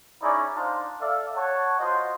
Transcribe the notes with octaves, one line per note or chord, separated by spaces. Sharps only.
C#4 D#4 E4 G#4 D5
D4 D#4 F4 C5 F5 A5
A4 D5 E5 F5
C#5 F#5 A5
F4 F#4 C5 D#5